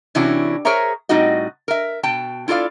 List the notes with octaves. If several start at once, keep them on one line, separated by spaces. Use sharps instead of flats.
C3 E3 C#4 D4 E4 F#4
G#4 A#4 C5 C#5 E5 A#5
A2 G3 C4 D#4 F#4 D#5
A#4 E5
B2 G5 A5
E4 F4 A4 D5 F5